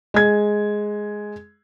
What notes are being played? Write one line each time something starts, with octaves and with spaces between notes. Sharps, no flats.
G#3 G#6